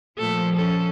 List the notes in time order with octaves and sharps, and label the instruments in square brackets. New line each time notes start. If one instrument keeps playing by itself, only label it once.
[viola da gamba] A#2 A3 A4 [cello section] F3
[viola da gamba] C#4 A4